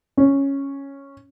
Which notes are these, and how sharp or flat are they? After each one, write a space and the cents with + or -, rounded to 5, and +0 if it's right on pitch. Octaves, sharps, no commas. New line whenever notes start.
C#4 -5